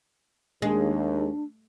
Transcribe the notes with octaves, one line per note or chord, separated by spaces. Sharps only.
D#2 G#3 D4